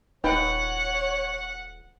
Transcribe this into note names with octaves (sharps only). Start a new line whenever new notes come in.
D#1 D#4 B4 C#5 F#5 G5